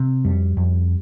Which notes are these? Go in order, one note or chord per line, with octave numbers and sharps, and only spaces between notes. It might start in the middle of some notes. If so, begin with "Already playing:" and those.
Already playing: C3
F2 G3
F2